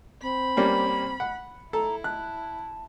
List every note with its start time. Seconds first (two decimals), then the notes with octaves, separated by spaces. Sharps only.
0.22 C4 B5
0.57 G3 A#3 C#4
1.20 F#5
1.73 E4 A4 A#5
2.04 A5 F#6